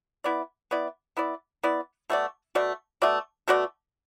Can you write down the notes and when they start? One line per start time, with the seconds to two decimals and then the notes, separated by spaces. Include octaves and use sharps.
0.24 B3 E4 D5
0.71 B3 E4 D5
1.17 B3 E4 D5
1.63 B3 E4 D5
2.10 B2 A3 F#4 D5
2.55 B2 A3 F#4 D5
3.02 B2 A3 F#4 D5
3.48 B2 A3 F#4 D5